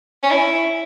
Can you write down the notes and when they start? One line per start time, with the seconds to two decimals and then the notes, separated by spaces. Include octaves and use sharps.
0.23 C#4
0.31 E4